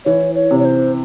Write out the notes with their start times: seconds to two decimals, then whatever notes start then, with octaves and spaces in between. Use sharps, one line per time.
0.05 E3 C#5
0.35 C#5
0.51 C3
0.59 C#5
0.65 C5